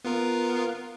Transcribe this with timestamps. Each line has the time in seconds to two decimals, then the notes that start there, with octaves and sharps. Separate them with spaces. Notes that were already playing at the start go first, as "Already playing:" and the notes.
0.04 B3 F4 A#4